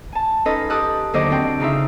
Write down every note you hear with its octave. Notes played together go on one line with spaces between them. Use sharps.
G#5 A5
C#4 D#4 F4 A4 B4 D#5
G4 A4 D#6 F#6
D#2 D3 F#3 C5 D#5 D6
C4 D4 F#4 G5
C#3 D#4 F4 E5